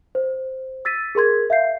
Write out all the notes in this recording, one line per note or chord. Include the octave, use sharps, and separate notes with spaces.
C5
E6 A6 B6 D#7
G#4 A#4 C6 G#6
E5 F5 G6 C7